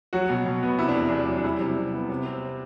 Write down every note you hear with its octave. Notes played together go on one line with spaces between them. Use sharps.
F#3 F#4
B2
B2
B3
C3 E4
D4
E2
E2 D4
F#3
D4
G3 E4
C3
C3
B3
C3
C4